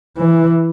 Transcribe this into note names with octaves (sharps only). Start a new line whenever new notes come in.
E3